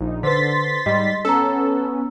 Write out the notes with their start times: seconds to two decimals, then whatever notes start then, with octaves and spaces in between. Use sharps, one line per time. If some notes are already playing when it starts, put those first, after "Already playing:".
0.01 A#1 D#4
0.23 D3 B4 C5 C6 A6 B6
0.86 G#2 G3 D#5
1.25 B3 C#4 A4 A#5 E6